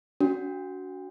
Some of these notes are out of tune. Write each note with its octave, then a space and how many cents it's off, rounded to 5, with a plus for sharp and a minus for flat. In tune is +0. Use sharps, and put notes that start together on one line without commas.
D4 -40 F#4 +5